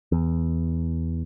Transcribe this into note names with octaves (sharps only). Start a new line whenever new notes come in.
E2